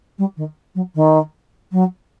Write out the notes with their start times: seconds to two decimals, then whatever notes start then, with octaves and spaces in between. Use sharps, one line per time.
0.18 G3
0.37 D#3
0.75 F#3
0.95 D#3
1.72 F#3